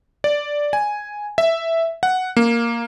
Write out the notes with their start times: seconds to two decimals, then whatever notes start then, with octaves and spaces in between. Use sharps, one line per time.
0.24 D5
0.73 G#5
1.38 E5
2.03 F#5
2.37 A#3